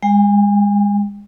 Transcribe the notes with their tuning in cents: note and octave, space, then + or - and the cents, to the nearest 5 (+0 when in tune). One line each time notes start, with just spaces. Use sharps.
G#3 -30 G5 +25